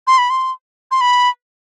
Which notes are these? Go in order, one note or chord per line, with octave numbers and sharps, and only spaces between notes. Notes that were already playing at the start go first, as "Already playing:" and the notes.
C6
B5
C6
C6
B5